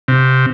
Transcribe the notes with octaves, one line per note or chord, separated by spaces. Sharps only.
C3